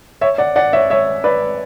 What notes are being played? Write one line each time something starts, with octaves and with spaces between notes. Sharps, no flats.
C#5 E5
D5 F#5
D5 F#5
C#5 E5
C#5 E5
B4 D5